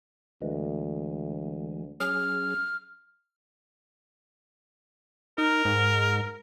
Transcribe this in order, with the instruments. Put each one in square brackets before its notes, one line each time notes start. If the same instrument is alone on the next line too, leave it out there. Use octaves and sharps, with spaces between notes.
[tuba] D2 [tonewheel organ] E3 G#3
[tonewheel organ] F#3 C#4 G#4 [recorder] F6
[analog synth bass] D#4 [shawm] A#4
[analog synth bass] G#2